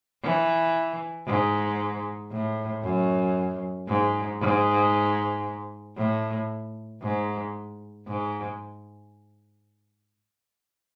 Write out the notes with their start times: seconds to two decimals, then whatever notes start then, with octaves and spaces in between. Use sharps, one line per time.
0.23 E3
1.27 G#2
2.32 A2
2.83 F#2
3.88 G#2
4.40 G#2
5.97 A2
7.02 G#2
8.07 G#2